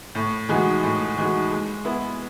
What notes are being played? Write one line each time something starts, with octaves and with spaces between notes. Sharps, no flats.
A2
E3 G#3 D#4 F#4
A2
E3 G#3 D#4 F#4
G#3
B3 E4